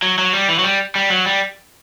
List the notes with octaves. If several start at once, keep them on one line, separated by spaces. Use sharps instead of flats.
F#3
F#3
G3
E3
F#3
G3
G3
F#3
G3